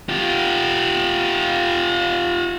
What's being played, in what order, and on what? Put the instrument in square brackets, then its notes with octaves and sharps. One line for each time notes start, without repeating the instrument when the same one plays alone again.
[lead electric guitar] F4 G4